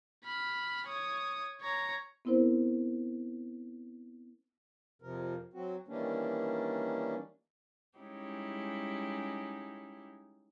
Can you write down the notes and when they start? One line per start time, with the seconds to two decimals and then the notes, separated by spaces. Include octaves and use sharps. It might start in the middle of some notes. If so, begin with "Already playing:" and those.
0.24 B5 F6
0.87 C#5 D#6
1.61 C#5 A#5
2.25 B3 C4 E4 A#4 C5
5.02 F2 C3 F3 A#4
5.54 F#3 C4 F#4
5.88 D#3 E3 G3 A#3 C#4 D4
7.98 G3 G#3 C#4 D#4 E4 G4